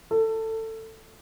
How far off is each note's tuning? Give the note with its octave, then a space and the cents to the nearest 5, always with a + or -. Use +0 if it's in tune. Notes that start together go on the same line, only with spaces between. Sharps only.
A4 +20